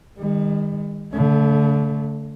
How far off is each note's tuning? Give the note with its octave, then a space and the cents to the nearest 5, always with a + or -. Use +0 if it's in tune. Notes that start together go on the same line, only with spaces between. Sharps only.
D#3 +0 G3 +45
D3 -40 A3 +0